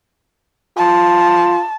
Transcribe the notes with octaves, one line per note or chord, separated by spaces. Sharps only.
F4 A5